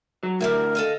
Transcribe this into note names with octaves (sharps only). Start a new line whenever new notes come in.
F#3
D2 G3 E4 A#4 E5
A4 D#5 F5